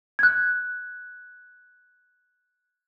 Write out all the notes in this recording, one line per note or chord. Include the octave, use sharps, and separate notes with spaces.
F#6 G#6